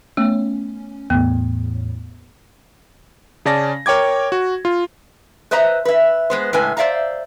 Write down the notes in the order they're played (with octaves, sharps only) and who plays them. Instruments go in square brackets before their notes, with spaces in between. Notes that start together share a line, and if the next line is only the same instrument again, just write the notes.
[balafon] A3 B3 [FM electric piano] C#4
[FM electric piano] E2 A2 [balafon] B3
[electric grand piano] C#3 C#4 D5 A5 A#6
A#4 C#5 G5 D6 G#6
F#4
F4
[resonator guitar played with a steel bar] B4 C5 D#5 E5 A#5
B4 E5
G#3 B3 C5
A2 C#3 G#3 B4 G#5
C5 D5 E5 F5 A#5